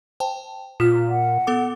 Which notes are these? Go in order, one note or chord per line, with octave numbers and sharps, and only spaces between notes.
C5 G5 A5
A#2 F4 F6 B6
F#5
B3 A4 D6